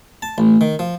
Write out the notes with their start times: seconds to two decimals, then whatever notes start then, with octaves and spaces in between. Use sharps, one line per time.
0.22 A5
0.38 A1
0.61 D#3
0.79 F3